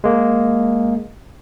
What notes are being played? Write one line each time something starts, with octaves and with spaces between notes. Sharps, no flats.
G#3 A#3